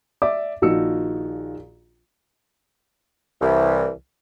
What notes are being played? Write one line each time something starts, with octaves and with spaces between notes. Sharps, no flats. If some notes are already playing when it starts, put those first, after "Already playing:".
D5 E5 D6
A#1 D#3 F3 F#4 E6 C#7
C2 E3